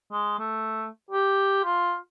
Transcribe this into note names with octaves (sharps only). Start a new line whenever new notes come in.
G#3
A3
G4
F4